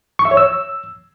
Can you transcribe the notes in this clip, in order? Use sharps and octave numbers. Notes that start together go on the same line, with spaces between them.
C#6
E5
C#5
E6